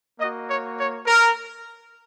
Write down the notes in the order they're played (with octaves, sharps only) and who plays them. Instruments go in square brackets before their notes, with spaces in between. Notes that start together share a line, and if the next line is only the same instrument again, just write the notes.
[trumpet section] A#3 D#5
F#4
C#5
C#5
A#4